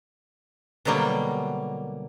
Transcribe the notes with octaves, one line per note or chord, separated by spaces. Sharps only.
B2 D3 F#3 G3 A#3